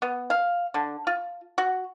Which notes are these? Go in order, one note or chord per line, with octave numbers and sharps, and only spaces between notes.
B3
F5
D3
F4
F#4